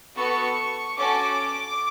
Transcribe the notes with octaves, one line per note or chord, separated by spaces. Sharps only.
B3 F#4 A4 C#6
C#4 F#4 A4 D6